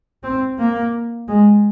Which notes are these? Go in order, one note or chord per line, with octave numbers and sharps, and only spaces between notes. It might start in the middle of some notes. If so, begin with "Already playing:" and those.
C4
A#3
G#3